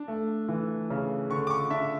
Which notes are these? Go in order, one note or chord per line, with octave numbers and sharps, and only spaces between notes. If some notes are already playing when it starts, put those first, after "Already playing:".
Already playing: D4
A3
E3
C#3
D3 C#6
D6
C#6
D4 E5